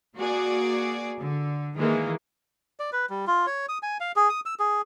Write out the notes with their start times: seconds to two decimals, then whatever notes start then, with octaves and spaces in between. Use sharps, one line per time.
0.16 A#3 F#4 G#4 D5
1.21 D3
1.77 D#3 E3 G#3 A#3
2.80 D5
2.93 B4
3.10 G3
3.27 F4
3.47 C#5
3.69 D#6
3.83 G#5
4.00 F5
4.16 G#4
4.30 D#6
4.46 E6
4.60 G#4